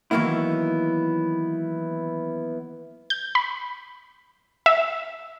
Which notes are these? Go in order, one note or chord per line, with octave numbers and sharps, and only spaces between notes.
D#3 E3 F#3 A#3 B3 E4
G6
B5
E5